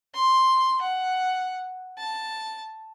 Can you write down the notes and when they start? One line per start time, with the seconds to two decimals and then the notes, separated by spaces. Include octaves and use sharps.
0.15 C6
0.82 F#5
1.98 A5